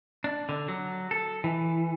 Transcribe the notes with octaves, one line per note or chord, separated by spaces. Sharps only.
D4
D3
F#3
A4
E3